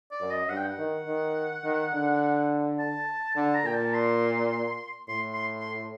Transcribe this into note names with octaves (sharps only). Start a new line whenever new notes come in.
D5
F#2
D#5
G2 F#5
G5
F#5
D#3
D#3
D#3
D3
A5
D3 A5
A#5
A#2 G5
A5
C6
A2 C6
C6
C6